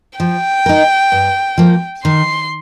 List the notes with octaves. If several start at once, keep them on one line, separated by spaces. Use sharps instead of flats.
F3 G5
D#4 A#4
G2
F3 A#3
D#3 C6